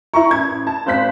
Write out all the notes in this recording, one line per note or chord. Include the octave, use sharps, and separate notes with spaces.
E4 A#5 C#6
A1 G#6
A5
G#1 C5 F#6 B6